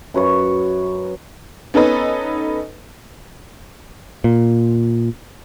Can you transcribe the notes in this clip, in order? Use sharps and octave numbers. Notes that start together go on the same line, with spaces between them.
F#2 B4 C#5 C#6
B3 C#4 D#4 A4 B4 D#5
A#2